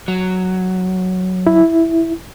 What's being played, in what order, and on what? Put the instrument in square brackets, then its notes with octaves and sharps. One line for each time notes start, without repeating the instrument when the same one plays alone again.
[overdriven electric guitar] F#3
[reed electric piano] E4